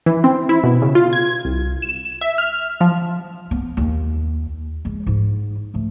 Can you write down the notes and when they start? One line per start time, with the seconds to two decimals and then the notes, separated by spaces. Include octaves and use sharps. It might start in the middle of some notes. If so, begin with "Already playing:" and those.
0.06 E3
0.24 C4
0.49 E4
0.64 B2
0.82 C#3
0.95 F4
1.13 G#6
1.45 C2
1.82 E7
2.21 E5
2.38 F6
2.81 F3
3.51 B3
3.77 D#2
4.85 G#3
5.07 G#2 D#4
5.74 G#2 A3